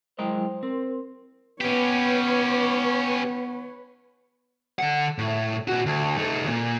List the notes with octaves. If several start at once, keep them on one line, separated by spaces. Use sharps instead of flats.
F#3 G#3 E4 A#4 C5 D#5 G5
C4 A#4 C6
B3 C#4 G4 B4 C#5
D3 F#5
A2
A#2 F#4
D2
A3 D#4
D2 A#2